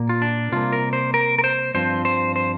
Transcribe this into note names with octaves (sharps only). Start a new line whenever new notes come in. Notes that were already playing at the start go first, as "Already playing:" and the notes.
Already playing: A#2 A#3
F4
D4
C3 G3 A#3 F4
A#4
C5
A#4
A#4
C5
G2 F3 C4 C5
C5
C5